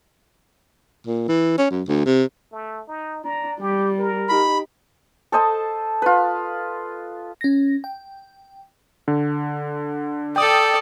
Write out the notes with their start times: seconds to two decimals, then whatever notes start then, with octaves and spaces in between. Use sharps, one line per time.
1.07 A#2
1.28 E3
1.58 C#4
1.71 F#2
1.88 D2
2.06 C3
2.52 A3
2.88 D#4
3.24 D4 A#5
3.60 G3 G4
3.98 A#4
4.29 D#4 G4 B5
5.32 A4 C5 D#5 A5
6.02 F4 B4
7.41 C#4 A#6
7.84 G5
9.08 D3
10.36 A4 D5 G5 D#6